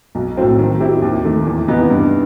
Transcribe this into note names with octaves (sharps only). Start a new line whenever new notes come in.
B1
A2 F#3 C4
D#3
F#3 C4 E4 G4
D#2
D#3 A3
E2
C3 E3 B3 D#4
G2